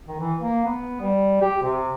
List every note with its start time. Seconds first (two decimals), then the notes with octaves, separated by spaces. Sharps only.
0.08 D#3
0.20 E3
0.41 A#3
0.65 B3
1.01 G3
1.41 G4
1.62 C3